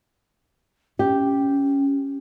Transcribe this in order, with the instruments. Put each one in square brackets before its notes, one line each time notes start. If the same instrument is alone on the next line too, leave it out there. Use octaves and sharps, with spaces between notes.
[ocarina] C#4 [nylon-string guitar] G4